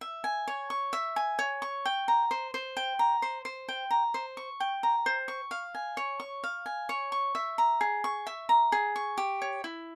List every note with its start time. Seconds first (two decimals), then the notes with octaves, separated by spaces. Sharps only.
0.01 E5
0.24 G#5
0.48 C#5
0.70 C#6
0.93 E5
1.16 G#5
1.39 C#5
1.62 C#6
1.85 G5
2.08 A#5
2.31 C5
2.54 C5
2.77 G5
2.99 A#5
3.22 C5
3.45 C5
3.68 G5
3.91 A#5
4.14 C5
4.37 C#6
4.60 G5
4.83 A#5
5.06 C5
5.28 C#6
5.51 F5
5.75 G#5
5.97 C#5
6.20 C#6
6.44 F5
6.66 G#5
6.89 C#5
7.12 C#6
7.35 E5
7.58 A#5
7.81 G#4
8.04 C#6
8.27 E5
8.49 A#5
8.72 G#4
8.96 C#6
9.17 G4
9.42 C#5
9.64 E4